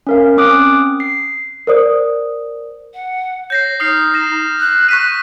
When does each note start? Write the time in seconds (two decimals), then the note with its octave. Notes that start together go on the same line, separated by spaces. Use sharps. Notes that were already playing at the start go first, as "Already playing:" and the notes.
0.07 C#4 A#4 F5
0.37 C4 C#4 D6 D#6 F#6 D7
1.00 C7
1.67 A#4 C5 D5 D#6
2.94 F#5
3.50 C#5 G6 A#6 C7
3.80 D#4 D#6 F6 C7
4.14 A#6 E7
4.60 F#6
4.89 C#6 B6 D#7